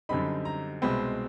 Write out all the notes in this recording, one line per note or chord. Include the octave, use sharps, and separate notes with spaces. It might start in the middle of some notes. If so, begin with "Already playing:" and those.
F#2 D3 G3 C4 D#4 B5
A#5
C2 B2 G#3 C4 B5